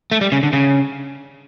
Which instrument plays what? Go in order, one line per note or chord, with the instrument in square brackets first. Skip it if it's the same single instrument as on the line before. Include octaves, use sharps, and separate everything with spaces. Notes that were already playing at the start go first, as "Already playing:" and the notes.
[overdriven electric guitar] A3
G3
C#3
D3
C#3